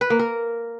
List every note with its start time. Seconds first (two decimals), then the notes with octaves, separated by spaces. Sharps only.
0.01 B4
0.10 A#3
0.19 A#4